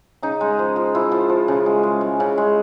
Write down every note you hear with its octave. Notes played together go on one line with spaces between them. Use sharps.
C#3 D#4
G#3
F3
F3
F3 E4
F3
F3
C#3
G#3
G#3
G#3
C#3
G#3